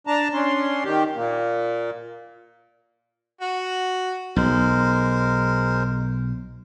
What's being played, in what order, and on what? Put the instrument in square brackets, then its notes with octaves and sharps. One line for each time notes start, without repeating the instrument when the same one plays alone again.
[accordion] D4 A5 A#5
C#4 D4 C6
D#3 G4
A#2 A#3
[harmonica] F#4
[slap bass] B1 [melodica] G#3 A#4 C5